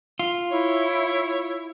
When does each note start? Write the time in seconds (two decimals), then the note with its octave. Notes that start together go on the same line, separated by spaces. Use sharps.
0.19 F4
0.52 E4 C#5